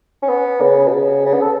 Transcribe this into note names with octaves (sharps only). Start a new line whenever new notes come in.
C#4
B3
C#3
B2
C#3
C#3
B3
A4